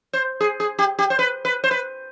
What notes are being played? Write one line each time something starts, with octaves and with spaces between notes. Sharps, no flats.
C5
G#4
G#4
G4
G4
C5
B4
B4
C5
B4